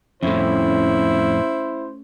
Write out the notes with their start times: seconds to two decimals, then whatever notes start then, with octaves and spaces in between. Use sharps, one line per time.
0.23 F2 A2 A3 C#4 E4 C5